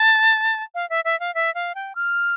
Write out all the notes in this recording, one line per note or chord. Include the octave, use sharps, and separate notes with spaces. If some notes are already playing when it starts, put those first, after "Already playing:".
Already playing: A5
F5
E5
E5
F5
E5
F5
G5
F6